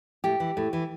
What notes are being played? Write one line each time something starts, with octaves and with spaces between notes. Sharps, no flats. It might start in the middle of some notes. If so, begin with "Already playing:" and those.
A2 G4
E3
A2
E3